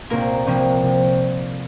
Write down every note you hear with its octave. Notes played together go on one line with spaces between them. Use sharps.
C2 A#2 A#3 A#4
C2 C3 F3 A#3
C3